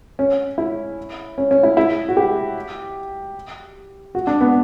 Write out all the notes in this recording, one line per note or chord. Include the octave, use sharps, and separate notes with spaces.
C#4
E4
C#4
C#4
E4
E4
F#4
G4
F#4
D4
B3